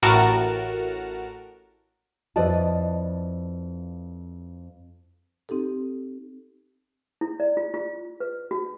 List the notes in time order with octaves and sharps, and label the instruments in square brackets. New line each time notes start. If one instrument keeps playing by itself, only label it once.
[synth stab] A1 A2 F#4 A#4 A5
[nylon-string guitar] F2 E4 B4 D5 D#5 A5
[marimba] C4 D#4 G4 A4
[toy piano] E4
D5
F4
F4
B4
F#4